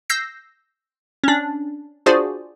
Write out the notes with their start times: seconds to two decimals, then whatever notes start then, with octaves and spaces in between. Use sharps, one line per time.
0.09 E6 G6 A#6 C7
1.24 C#4 D4
2.06 D4 F4 F#4 G#4 C5 D5